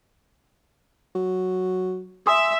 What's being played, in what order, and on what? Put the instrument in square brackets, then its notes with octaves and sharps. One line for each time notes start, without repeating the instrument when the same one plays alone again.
[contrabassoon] F#3
[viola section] E5 [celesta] G#5 C6 D#6